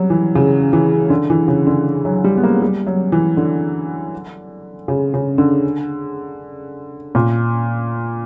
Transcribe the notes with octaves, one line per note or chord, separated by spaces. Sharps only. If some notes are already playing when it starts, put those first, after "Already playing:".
Already playing: F#3 G3
E3
C#3
E3
D3
E3
C#3
D3
F#3
G3
B3
A#3
G3
F#3
E3
D3
C#3
C#3
D3
A#2